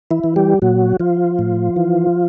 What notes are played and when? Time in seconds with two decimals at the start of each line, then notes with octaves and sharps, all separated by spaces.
0.11 E3 E4
0.24 E3
0.36 G3 G4
0.62 A#2 F#3 F#4
1.00 F3 F4
1.39 A2
1.76 E3